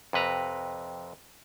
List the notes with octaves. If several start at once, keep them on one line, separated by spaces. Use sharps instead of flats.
F2 C3 B4 A#5